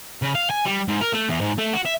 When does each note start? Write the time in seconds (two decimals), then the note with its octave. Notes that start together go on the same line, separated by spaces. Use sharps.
0.22 C#3
0.35 F5
0.51 G#5
0.66 G3
0.88 G#2
1.01 A#4
1.13 A3
1.29 E2
1.41 G#2
1.58 A3
1.73 F#4
1.85 E5